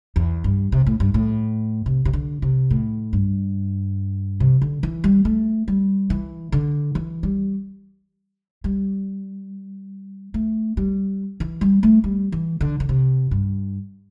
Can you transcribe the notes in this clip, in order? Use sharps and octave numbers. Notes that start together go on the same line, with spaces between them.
E2
G2
C3
A2
G2
A2
C3
C3
D3
C3
A2
G2
C3
D3
E3
G3
A3
G3
E3
D3
E3
G3
G3
A3
G3
E3
G3
A3
G3
E3
D3
D3
C3
G2